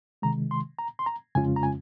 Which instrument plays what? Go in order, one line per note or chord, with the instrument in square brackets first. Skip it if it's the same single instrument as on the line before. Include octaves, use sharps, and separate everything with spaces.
[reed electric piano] C3 D#3 G#3 A#5
C6
A#5
C6
A#5
F2 C#3 G#3 C#4 F4 G#5
A#5
G#5